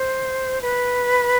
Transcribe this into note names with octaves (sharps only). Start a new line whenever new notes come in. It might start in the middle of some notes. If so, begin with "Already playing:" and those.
Already playing: C5
B4